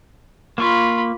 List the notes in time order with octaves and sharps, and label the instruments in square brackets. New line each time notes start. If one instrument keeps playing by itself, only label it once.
[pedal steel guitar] A#3 C#6 [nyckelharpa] F4 B5